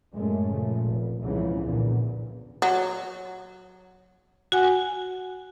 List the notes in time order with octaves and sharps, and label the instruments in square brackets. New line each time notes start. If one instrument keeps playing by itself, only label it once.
[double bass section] F#2 A2 G#3 A3 C#4
A#2 C#3 F3 A3
F1
C2 G#2 C#3 E3 F3
E2 A#2 D3
[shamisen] F#3
[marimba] F#4 F#5 G#5